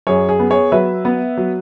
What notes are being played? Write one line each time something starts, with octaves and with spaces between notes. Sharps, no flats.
F#2 G#4 C#5
G#4
B3
G#4 C#5
F#3 B4 E5
B3
F#3